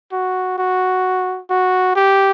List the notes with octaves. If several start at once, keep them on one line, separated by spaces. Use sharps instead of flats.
F#4
F#4
F#4
G4